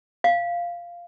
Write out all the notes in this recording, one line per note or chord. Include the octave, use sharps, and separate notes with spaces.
F5